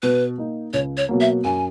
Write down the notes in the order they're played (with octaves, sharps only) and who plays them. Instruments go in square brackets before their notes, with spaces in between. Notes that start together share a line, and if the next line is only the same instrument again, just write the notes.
[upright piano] B2 [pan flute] B4
[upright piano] A#3 D#4
[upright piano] C#2 [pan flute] C#5
[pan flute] C#5
[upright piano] B2 F#3 A#3
[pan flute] E5
[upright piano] F#2 [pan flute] G#5